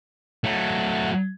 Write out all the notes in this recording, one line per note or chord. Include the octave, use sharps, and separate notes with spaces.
F#3 A3